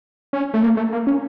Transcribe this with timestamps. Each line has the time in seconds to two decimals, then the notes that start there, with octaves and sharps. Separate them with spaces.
0.33 C#4
0.54 A3
0.63 A#3
0.77 A3
0.93 A#3
1.07 C#4